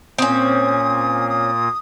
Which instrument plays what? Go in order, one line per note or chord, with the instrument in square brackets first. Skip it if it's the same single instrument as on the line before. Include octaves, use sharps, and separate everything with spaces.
[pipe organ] A#2 A#3 F4 [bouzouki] C4 C#4 [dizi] D#6
[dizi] D#6